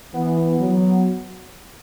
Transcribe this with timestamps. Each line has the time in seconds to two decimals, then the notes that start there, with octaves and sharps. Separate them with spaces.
0.14 E3 B3
0.60 F#3